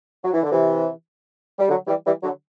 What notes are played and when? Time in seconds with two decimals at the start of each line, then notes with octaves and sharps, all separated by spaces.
0.24 F#3
0.33 E3
0.43 D3
0.51 C3 E3
1.58 G3
1.69 D3 F#3
1.87 E3 G3
2.06 E3 G3
2.23 D3 F#3